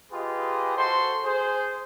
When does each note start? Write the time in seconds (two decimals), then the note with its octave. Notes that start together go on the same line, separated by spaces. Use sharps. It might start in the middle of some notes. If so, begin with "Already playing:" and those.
0.12 F4 G4 G#4 B4 D#5
0.76 F#4 A4 C5 C6
1.23 G#4 C5